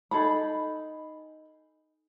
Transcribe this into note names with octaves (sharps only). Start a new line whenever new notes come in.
D#4 G#4 A4 B5